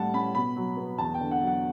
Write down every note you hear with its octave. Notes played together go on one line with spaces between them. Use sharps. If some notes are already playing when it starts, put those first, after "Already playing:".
Already playing: A2 G3 F#5 A5
C#4 B5
B2 B5
F#3
B3
E2 A5
G5
D3
F#5
F#3
F#5